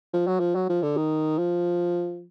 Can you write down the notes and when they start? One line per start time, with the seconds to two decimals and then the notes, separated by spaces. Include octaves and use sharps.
0.13 F3
0.27 F#3
0.40 F3
0.55 F#3
0.69 F3
0.83 D3
0.97 D#3
1.38 F3